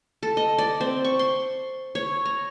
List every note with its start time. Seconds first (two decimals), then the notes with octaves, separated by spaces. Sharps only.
0.23 A4
0.37 D#5
0.58 D5
0.80 C4
1.04 C#6
1.19 C6
1.95 C#5
2.25 A#5